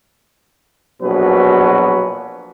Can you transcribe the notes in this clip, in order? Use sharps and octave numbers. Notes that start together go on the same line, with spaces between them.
A#1 B2 F#3 B4